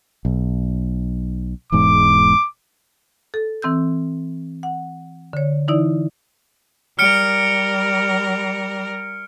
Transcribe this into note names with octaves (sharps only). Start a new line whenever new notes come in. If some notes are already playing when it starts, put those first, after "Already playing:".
B1
E1 E2 G#2 D6
A4
E3 C4 E6 G6
F#5
D3 C#5
E3 D#4 E4 D5
G3 A#4 F6 C#7 D7